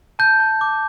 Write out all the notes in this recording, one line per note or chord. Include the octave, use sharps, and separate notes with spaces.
A5 G6
A5
D6